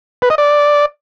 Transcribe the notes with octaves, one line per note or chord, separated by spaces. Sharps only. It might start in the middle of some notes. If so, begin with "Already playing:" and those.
B4
D#5
D5